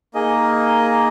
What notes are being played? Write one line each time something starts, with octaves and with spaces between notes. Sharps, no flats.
A#3 D#4 G#4 D#5